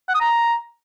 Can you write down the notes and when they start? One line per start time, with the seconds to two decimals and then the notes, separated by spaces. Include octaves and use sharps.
0.08 F#5
0.14 D#6
0.20 A#5